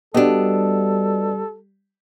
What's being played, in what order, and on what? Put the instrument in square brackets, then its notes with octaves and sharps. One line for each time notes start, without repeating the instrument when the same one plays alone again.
[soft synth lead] G3 [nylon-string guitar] B3 D4 [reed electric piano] F#4 G4 D#5 [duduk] A4